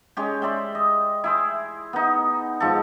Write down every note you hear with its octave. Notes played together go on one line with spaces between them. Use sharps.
G#3 C#4 G4
C5 D5 E5 G5
D#5
E4 G#4 C5
B3 D#4
G#2 F3 G4 A4